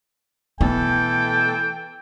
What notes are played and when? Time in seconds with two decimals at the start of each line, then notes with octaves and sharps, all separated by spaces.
0.61 B2 E3 A3 E4 A4 G5